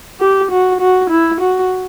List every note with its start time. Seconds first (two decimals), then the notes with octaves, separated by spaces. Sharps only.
0.20 G4
0.51 F#4
0.81 F#4
1.10 E4
1.41 F#4